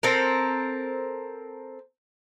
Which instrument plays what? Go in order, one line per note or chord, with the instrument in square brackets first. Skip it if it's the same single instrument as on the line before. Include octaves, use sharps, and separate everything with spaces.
[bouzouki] C4 A4 A#4